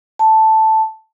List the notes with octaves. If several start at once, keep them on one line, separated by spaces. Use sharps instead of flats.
A5